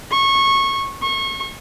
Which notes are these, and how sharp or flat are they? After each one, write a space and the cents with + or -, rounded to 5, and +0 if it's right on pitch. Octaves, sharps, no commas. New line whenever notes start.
C#6 -20
C#6 -30